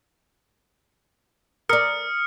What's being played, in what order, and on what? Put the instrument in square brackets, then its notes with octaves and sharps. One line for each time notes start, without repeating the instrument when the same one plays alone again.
[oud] A#4 D5 [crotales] D#6 F6 C#7